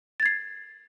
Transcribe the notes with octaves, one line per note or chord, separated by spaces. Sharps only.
G#6 A6 C7